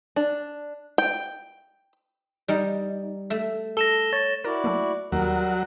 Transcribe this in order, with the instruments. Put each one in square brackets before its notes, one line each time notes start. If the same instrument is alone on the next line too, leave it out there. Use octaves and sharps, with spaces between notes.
[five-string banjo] D4
G5
[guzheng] G3 D#4
A3 E5
[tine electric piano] A4 [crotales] A#6 E7 G7
[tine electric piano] C#5 [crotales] A6
[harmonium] E4 F#4 D5 [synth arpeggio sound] A#4
[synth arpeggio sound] F#3 A3 A#3
[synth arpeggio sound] D#2 [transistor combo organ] F#3 [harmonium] G3 A#4